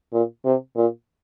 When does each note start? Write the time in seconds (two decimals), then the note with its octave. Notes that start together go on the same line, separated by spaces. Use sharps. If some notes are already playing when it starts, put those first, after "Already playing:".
0.13 A#2
0.45 C3
0.76 A#2